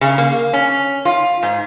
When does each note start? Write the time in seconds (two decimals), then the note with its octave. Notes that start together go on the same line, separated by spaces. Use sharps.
0.01 C#3
0.18 A#3
0.53 C#4
1.05 F4
1.43 G#2